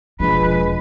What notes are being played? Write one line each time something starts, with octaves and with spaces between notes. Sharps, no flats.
E1 F3 G#3 D4 B4